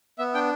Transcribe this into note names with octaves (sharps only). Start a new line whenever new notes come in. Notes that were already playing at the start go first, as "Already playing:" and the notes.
B3 E5
D4 G5